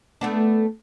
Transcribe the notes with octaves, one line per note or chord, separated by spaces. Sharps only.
A3 B3 D4